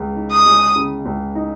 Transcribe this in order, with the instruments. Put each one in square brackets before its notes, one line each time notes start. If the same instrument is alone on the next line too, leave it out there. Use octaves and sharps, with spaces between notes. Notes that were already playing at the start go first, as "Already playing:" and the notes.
Already playing: [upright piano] C#2 C#3
D#4
[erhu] D#6
[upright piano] G#3
C#3
C#2
D#4